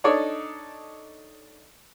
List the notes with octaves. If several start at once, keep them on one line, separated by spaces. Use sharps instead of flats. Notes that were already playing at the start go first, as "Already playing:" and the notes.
D4 D#4 A4 C#5 D5